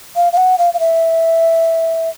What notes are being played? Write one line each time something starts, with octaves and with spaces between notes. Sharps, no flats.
F5
F5
F#5
F5
F5
E5